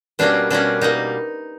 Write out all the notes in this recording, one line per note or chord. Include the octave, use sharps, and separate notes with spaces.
B2 G3 A#3 C#4 D4
B2 G3 A#3 C#4 D4
B2 G3 A#3 D#4